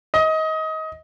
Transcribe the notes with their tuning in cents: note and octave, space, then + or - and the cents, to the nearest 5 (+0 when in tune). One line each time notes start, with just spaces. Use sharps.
D#5 +25